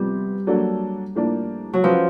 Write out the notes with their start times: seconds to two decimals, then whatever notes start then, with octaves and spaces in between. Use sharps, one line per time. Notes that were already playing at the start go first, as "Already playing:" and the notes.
Already playing: C3 F3 G3 G#3 B3
0.47 F#3 A#3 D4 F#4 A4
1.15 A2 F3 A#3 D4
1.73 F#3
1.83 F3 G#3 C#4 F#4 B4